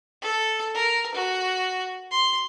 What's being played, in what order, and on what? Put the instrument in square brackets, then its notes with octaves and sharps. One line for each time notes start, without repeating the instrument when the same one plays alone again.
[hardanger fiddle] A4
A#4
F#4
C6